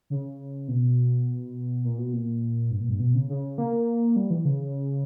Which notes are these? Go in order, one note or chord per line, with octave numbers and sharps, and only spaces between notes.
C#3
B2
A#2
B2
A#2
G2
A#2
G2
B2
C#3
C#3
A#3
G3
E3
C#3